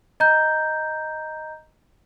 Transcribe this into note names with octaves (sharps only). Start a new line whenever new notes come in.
D#5 A#5 G6